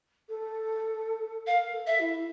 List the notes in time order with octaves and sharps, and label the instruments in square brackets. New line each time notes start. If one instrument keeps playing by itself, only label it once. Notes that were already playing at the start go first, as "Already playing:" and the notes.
[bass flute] A4
[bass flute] A#4 [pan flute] F5
[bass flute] A4
[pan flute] E5
[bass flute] E4